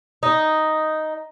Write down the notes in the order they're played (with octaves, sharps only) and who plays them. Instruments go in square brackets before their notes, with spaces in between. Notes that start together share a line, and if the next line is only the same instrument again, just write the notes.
[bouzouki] D#4